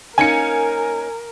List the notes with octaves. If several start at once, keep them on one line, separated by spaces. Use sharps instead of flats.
A#3 C#4 D#4 A#4 G#5 C#7